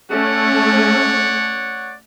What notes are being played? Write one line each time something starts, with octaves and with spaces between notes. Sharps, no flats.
A3 C#4 C#5 D5 F#5